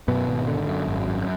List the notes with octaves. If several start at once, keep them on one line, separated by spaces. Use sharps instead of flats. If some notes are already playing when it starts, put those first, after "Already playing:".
F#2 B2 B3
G#1
D3
F#2
G#1
F#2